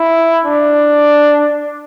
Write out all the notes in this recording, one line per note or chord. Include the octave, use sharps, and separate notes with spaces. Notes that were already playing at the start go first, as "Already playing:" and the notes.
Already playing: E4
D4